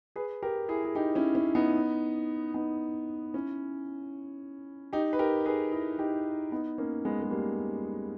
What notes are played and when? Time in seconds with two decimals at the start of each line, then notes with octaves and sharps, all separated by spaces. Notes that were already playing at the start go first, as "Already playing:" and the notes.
0.16 G#4 B4
0.43 G4 A#4
0.69 E4 G#4
0.85 G#4
0.95 D#4 G4
1.15 C#4 E4
1.35 C#4 E4
1.55 B3 D#4
2.54 B3 D#4
3.33 C#4 E4
4.93 D#4 G4
5.13 B4
5.19 G4 A#4
5.46 G#4 B4
5.72 E4 G#4
5.98 D#4 G4
6.52 B3 D#4
6.78 A#3 C#4
7.05 G#3 B3
7.22 G#3
7.31 G3 A#3